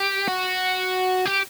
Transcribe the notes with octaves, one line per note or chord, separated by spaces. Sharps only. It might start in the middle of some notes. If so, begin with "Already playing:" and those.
Already playing: G4
F#4
G4